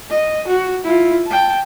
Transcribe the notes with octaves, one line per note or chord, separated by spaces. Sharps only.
D#5
F#4
E4 F4
G5 A5